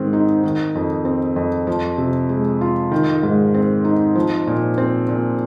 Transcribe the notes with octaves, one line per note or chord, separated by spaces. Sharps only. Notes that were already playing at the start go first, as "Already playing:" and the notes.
Already playing: G#2 D#3 C4
D#4
D#3
F2
C4
F2
F3
C3
G#3
F4
D#3
G#2
C4
D#4
F3
A#2
C4
A#2